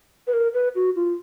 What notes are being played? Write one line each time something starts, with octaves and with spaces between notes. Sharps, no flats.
B4
A#4
B4
F#4
F4